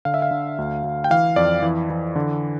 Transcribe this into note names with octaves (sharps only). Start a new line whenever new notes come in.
D3 F5
E5
F5
D3
D2
D2
G5
E3 F5
F2 D5
E3
E3
D3